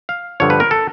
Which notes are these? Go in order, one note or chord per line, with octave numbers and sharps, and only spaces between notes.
F5
G2 D3 F3 C#5
B4
A#4
A4